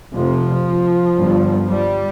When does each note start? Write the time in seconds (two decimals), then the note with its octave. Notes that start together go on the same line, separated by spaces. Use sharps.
0.14 F1 F2 C3 F3
1.18 G1 G2
1.69 G3